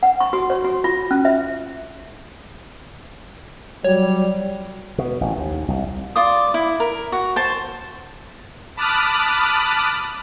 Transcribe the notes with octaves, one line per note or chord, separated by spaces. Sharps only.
F#5
C#6
F#4
C#5
F#4
F4
C#4
E5
F#3 G3 C#5
B2
A1
D#2
C2
F4 D5 D#6
E4
A#4
F#4
C5 A5
A5 B5 D6 D#6 F6 F#6